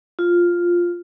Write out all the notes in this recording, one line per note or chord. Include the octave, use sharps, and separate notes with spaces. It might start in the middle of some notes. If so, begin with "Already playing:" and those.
F4